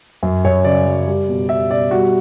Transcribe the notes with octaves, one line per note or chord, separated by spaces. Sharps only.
F#2
F#2 C#5
C#3 D5
F#3
G3
B2
G3 E5
B2 D5
G3 F#4